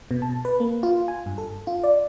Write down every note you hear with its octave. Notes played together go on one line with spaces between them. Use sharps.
B2
A5
B4
A#3
F4
G#5
G2
A4
F4
D5